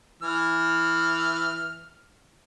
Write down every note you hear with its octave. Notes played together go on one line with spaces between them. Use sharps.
E3 F6